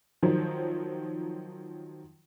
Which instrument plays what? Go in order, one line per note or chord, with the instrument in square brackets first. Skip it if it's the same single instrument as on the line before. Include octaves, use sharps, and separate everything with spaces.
[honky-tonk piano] D#3 F3 F#3 C5